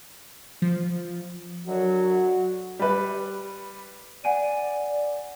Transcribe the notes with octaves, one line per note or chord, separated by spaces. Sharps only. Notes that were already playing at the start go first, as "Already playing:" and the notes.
F3
F#2 D3 F#3 F#4
G3 B4
D5 F#5 G#5 D#7